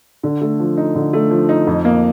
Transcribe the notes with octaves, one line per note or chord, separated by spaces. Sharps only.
D3
A3
F3
D#4
D3
A3
F3
D#4
F2
A#3